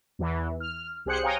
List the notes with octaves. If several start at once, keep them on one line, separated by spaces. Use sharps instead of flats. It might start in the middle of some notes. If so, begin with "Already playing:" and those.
E2 E3
F6
C2 G4 G#4 C5 F#6 C#7
C#5 F5 G5 G#5 A#5 D#6